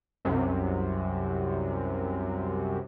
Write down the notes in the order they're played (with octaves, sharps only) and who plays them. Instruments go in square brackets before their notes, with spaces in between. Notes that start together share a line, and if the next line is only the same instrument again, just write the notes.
[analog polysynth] C2 F#2 C3